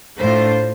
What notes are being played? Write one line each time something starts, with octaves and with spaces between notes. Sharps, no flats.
A2 A3 D4 F4 C5